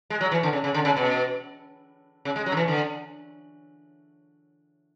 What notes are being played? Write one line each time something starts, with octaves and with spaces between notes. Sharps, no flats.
G#3
F#3
E3
D3
C#3
C#3
D3
C#3
B2
C#3
G#3
F#3
D3
E3
D3